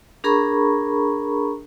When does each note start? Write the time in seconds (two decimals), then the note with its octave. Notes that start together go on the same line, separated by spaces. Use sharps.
0.24 D4 G#4 A#4 A#5 B5 C#6